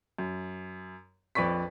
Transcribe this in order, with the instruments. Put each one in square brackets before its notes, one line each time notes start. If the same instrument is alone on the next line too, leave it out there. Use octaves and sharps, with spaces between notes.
[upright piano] F#2
A#1 F2 B4 D5 C#6 B6